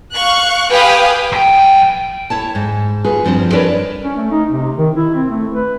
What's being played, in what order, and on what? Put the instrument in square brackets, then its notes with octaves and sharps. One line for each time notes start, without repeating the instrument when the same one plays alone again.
[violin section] F5 C#6 F#6
G4 B4 F5 G5 G#5 D#6
[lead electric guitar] F#2 G5
[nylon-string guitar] E4 C#5 A5
G#2
F4 F#4 G#4 B4
G2 F3 C4 D4 C5
D4 E4 A#4 B4 C#5 D5
[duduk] C#4
A3
D#4
C3
D#3
E4
C4
A3
B4